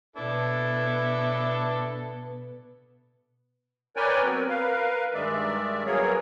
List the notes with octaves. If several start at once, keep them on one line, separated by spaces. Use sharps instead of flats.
B2 B3 D4 E4 A4
A#4 B4 C#5 D5 G5 G#5
F#3 B3 C4 A#4
A#4 B4 F5
G2 D#3 G#3 D5 E5
F#3 A#3 B3 G#4 A#4 C#5